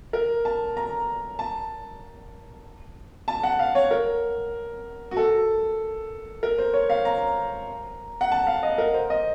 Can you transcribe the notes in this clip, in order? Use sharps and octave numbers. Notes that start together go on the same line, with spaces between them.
A#4
A5
A#5
A5
A5
F#5
F5
C#5
A#4
F#4
A4
A#4
C5
C#5
F5
A#5
F#5
A5
F5
D#5
A#4
C5
D#5